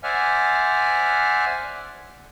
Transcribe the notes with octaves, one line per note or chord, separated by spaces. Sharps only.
C5 D5 E5 F#5 G#5 F6